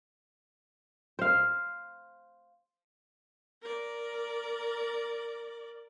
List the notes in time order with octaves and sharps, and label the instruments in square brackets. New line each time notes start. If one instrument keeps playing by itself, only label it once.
[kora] C5 F5
[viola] A#4 D5